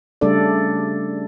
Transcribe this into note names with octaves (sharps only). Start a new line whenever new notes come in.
C#3 G3 A3 D4 A4 D5